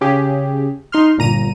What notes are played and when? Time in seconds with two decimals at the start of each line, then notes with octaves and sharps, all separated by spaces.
0.01 C#3 C#4 G4 G#4
0.92 D#4 C6 F6
1.18 G1 A#2 A#5 D#7